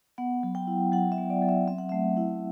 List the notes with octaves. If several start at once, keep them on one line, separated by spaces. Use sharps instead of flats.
B3 F#5
F#3
G5
E4
F#3 F#5
E5
B3
D5
F#3
E5
C4 E5
F#5
A3 E5
E4